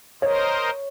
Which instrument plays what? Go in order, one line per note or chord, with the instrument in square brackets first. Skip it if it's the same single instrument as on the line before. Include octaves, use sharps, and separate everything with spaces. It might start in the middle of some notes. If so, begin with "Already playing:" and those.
[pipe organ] A#4 C5 D#5 [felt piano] C#5